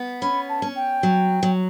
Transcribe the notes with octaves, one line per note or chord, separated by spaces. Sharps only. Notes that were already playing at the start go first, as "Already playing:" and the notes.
Already playing: B3
C#4 B5
A5
C#4
G5
F#3
F#3